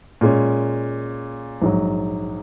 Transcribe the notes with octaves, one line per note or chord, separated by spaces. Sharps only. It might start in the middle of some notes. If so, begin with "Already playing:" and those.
A#2 G#3 C#4
A#1 G#2 F#3